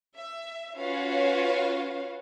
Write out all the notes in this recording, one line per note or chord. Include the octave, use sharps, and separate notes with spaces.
E5
C#4 F4 F#4 B4 C#5 F5